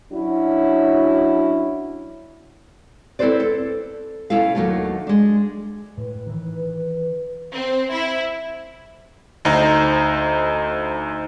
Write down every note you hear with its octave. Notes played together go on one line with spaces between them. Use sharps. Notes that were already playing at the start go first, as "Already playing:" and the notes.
F#3 C#4 D4 E4 F#4
C4 E4 A4 B4 C5 D5
A4
B2 C#4 E4 F4 A4 F5
D#2 G#2 D#3 F#3 A3 A4
G#3 D4
A2 B4
D#3 E3
C4
E4
D2 D#4 C5 A#5